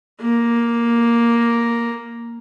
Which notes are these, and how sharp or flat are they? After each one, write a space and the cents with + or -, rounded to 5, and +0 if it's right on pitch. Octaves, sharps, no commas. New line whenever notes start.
A#3 +5